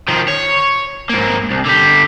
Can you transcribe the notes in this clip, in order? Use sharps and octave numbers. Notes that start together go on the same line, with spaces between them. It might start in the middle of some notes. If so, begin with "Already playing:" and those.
D#3 F3
C#5
G#2 A#3
C2
D3 G4